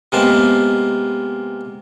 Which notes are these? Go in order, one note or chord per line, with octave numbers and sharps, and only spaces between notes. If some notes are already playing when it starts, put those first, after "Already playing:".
C3 G#3 A#3 B3 A5 C6